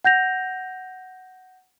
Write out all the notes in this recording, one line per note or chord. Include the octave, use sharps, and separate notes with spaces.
F#5 G6 A#6 F7